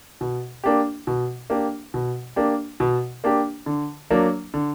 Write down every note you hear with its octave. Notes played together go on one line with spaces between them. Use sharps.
B2
A#3 D4 G4
B2
A#3 D4 G4
B2
A#3 D4 G4
B2
A#3 D4 G4
D3
F#3 A#3 D4
D3